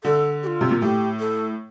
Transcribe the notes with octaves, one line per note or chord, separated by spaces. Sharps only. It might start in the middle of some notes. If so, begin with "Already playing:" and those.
D3 A4
G4
F4
C3
A#2
A2 G4
A4